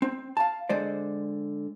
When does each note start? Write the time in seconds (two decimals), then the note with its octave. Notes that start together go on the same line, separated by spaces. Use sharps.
0.02 C4
0.37 F5 A5
0.69 D3 G#3 C5 D5